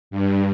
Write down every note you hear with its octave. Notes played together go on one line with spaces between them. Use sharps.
G2